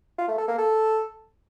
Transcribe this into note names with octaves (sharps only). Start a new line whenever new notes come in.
F4
A3
A4
A#3
A4